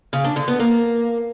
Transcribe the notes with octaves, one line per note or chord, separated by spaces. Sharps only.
C#3
D4
D3
B3
A#3